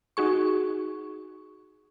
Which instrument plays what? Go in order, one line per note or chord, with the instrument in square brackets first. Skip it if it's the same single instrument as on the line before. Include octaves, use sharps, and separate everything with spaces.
[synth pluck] D#4 F#4 G#4 C#6